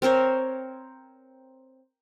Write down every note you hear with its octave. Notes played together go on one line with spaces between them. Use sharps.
C4 A#4 C5 C#5